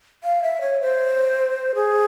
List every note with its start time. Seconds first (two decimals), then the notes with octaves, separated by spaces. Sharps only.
0.24 F5
0.43 E5
0.61 C#5
0.81 C5
1.75 G#4